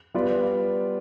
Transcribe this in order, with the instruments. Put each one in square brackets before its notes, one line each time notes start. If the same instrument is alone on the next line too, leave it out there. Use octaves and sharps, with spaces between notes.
[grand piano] G3 B3 F4 B4 D5